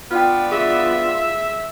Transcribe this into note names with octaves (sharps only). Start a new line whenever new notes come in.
B3 D4 F4 D5 G5 F6
G#4 E5